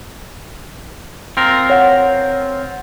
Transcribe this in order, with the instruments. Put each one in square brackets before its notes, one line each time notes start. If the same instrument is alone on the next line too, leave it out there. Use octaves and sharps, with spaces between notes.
[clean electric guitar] C4 F4 A#4
[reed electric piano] C#5 F#5